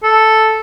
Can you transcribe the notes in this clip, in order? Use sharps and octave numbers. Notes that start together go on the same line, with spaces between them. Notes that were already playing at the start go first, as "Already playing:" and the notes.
A4